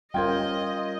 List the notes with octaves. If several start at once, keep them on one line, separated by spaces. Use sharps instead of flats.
G3 C#4 F4 A#4 C5 D#5 G5 G#6